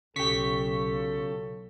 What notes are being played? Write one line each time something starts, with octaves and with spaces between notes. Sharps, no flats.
B1 C#3 F#3 F4 G4 A4 C#6 B6